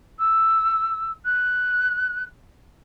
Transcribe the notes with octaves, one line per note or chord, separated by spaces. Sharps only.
E6
F#6